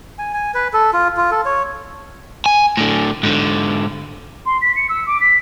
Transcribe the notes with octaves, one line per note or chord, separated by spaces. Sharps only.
G#5
G#5
B4
A4
F4
F4
A4
C#5
G#5
A2 D3
G#2 D3
C6
B6
C#7
E6
D6
B6